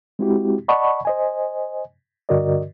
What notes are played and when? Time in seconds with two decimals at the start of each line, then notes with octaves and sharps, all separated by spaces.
0.19 G#3 C4 E4 F#4 G4
0.68 D5 D#5 F#5 A5 B5 C#6
1.05 C5 D#5 G#5
2.29 G2 D3 F#4 A#4 D5 D#5